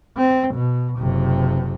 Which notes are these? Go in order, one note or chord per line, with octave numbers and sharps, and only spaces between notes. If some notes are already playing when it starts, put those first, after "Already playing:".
C4
B2
F#1 C3